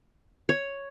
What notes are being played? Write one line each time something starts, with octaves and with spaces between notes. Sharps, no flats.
C#5